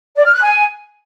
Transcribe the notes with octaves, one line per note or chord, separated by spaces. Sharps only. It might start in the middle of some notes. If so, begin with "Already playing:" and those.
D5
F6
F#6
G#5